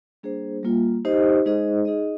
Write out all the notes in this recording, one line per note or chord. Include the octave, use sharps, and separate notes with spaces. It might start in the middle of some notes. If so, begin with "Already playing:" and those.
G3 A#3 D4 G#4 C5
G3 A#3 F4
D#4 G4 C5 D#5
G#3 D#4 G#4 C5 D#5
D#4 G#4 D#5